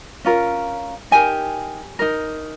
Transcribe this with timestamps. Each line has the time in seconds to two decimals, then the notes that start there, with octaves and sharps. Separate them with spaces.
0.25 C#4 F4 A#4
1.11 D#4 G4 A#4 G#5
1.99 D#4 A#4